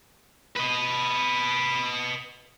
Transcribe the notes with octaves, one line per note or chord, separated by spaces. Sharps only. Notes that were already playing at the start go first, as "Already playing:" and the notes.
B4 D#5